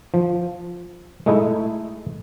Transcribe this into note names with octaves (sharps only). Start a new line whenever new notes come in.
F3
G#3 A3 D#4 E4